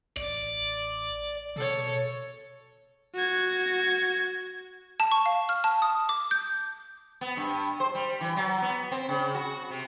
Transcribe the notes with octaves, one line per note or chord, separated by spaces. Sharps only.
A1 D5
B2 A4 C#5
F#4 G#6
A5
C#6
F5
F6
A5
D#6
D6
G6
B3
G2
C5
G3
E3
F#3
B3
C4
C#3
F#4
C3